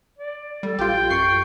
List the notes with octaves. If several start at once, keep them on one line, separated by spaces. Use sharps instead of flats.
D5
G3 A4
A#1 F4 G4 G5
F#2 C#6 C7